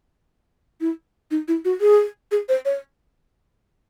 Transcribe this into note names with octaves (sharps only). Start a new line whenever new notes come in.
E4
D#4
E4
F#4
G#4
G#4
C5
C#5